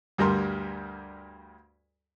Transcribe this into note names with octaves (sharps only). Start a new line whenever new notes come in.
D2 G2 G3 A#4 A#5 C6